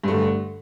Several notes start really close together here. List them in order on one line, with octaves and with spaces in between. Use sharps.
G2 A3 D3